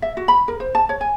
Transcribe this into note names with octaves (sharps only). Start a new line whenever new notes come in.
E5
F#4
B5
A#4
C5
A5
C#5
G#5